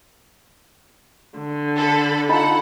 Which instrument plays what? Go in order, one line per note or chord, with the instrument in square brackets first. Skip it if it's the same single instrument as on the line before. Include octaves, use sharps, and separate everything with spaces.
[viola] D3
[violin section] A4 B5
[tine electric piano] D#4 F4 [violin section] A4 F#5 [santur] B5